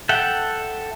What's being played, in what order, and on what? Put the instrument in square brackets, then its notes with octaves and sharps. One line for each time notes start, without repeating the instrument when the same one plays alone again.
[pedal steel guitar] A4 E5 F#5 G5